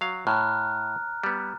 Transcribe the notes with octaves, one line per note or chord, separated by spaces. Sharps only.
F#3 F5
A2 A#5 F6 F#6
G3 B3